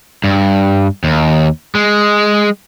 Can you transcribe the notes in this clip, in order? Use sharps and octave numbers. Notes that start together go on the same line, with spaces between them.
G2
D#2
G#3